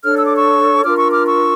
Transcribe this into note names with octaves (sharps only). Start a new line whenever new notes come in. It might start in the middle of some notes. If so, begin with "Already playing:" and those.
D4 A4 C#5 F6
E6
D6
C#6 E6
D4 F4 A#4 D6 F6
C#6 E6
D6 F6
C#6 E6